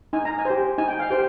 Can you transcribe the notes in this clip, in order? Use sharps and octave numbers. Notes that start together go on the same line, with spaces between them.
D#4 G#5
A#5
G#5
G4 C5
D#4 G#5
G5
F5
G4 C5 G5